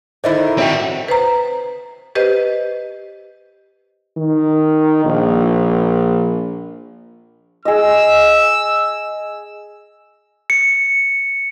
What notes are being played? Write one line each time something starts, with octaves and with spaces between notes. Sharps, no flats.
D3 D#3 E4 C5 D#5 E5
C4 F#4 C#5 E5 G5
B4 C5 A#5
G4 B4 C5 D#5
D#3
A#1
G#4 D#5 E6
C#7